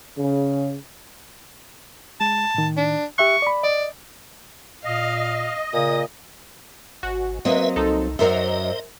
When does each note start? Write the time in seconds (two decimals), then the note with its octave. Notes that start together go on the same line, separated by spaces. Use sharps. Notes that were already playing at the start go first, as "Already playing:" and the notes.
0.17 C#3
2.21 G#3 A5
2.54 A2 D#3
2.77 D4
3.18 G4 E5 C#6 F#6
3.42 D5 B5
3.63 D5 D#5
4.84 A#2 D#5 F5
5.73 A#2 C#3 D#6
7.03 G#1 F#4
7.45 F#3 A#3 C4 B4 D#5 E5
7.76 C2 D#4 A4
8.19 F#2 F#3 A#4 C5 D#5 E5